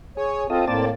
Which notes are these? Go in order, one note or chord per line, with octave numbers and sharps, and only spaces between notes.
G#4 C#5
C4 F4 A4 D#5
A2 A#3 C4 D5 A5